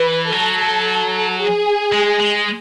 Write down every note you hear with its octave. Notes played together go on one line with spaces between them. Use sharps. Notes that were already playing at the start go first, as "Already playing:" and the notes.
Already playing: E3 B4
F#3 A4
G#4
G#3
G#3